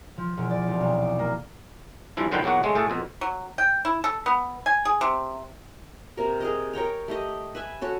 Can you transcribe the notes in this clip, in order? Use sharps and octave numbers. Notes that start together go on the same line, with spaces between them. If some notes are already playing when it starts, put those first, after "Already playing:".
F3
E1
D5
C2
B1
D6
A#3
G2 C3 E3 F3 E4
F#2 D3 D#3 F3 B4 G5
B1 E2 F#3 A#3 F#4 F#5
C#3 G#3 A3
A2 A3 G#4 A4 A5
F2 B2
F#3
G5
E4
A4
B3
G#5
G#4
C3
C3 A#3 A#4
G#4 A#4 D#5
A#4 C#5 G5 A#5
A3 G4 D#5
B4 E5 G#5
C#4 F#4 A4